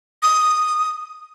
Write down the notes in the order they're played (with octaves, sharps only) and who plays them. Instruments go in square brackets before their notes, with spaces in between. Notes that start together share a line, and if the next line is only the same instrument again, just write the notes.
[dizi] D#6